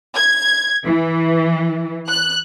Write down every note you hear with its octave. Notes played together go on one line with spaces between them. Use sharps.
G#6
E3
F#6